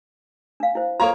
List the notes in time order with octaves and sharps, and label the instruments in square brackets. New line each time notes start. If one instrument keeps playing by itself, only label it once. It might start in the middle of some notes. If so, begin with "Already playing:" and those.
[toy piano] D4 F5
E4 C5
[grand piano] A#3 C#5 A#5 [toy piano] F4 A4